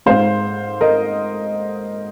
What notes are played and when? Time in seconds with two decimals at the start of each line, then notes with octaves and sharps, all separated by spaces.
0.06 G#2 G#3 C5 F5
0.81 A#4 D#5